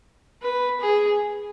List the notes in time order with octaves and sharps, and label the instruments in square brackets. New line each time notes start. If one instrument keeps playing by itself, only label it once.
[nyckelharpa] B4
G#4